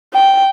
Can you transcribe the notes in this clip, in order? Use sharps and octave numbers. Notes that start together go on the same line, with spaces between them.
G5